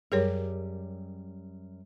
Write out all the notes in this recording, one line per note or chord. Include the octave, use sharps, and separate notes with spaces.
F#2 G3 G4 G#4 A#4 C#5